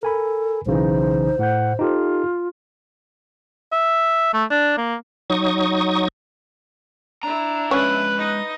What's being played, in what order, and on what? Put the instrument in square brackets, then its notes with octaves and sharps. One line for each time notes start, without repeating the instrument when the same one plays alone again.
[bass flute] A4 [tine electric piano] A#4 G#5 B5
[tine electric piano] B1 C#3 E3 [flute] D#4 [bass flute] C5
[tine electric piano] A2 G6 [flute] F#5
[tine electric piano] D#4 G4 A4 [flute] F4
[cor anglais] E5
A3
D4
A#3
[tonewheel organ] F#3 D#4 C#6 D#6
[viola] D4 E4 [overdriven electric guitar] A#5
[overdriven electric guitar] G#3 E5 [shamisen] C#4 [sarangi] B4
[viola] D#4 D#5